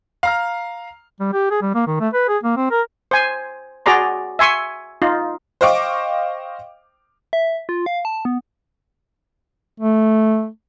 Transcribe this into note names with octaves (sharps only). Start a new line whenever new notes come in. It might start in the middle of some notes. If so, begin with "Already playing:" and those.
F5 A#5 F6
G3
G4
G#4
G3
A#3
D#3
A3
B4
G#4
A#3
C4
A#4
C5 G#5
F#4 G#4 D5 A#5 C6
E5 G#5 C6 C#6
D#4 F4
C5 D#5 F5 G5 C#6 D6
E5
F4
F5
A5
B3
A3